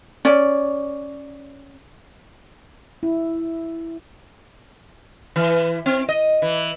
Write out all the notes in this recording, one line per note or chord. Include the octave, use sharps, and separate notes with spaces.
C#4 D5
E4
E3
C4
D#5
E3